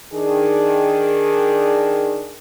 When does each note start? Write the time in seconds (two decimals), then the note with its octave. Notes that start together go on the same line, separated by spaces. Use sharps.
0.13 D#3 D4 G#4